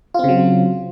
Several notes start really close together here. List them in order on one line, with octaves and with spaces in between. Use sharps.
F4 C4 C#3 F#3